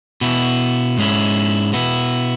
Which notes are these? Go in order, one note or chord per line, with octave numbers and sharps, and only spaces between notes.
B2 B3 E4
G#2 G#3 C#4 E4
B2 B3 E4